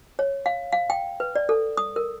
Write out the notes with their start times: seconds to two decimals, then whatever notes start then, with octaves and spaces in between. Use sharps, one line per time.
0.19 C#5
0.46 F5
0.72 F5
0.90 G5
1.20 B4
1.36 D5
1.49 A4
1.77 D#6
1.96 A#4